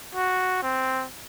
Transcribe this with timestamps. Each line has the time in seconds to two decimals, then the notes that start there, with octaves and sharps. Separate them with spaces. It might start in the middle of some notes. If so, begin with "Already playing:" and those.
0.15 F#4
0.63 C4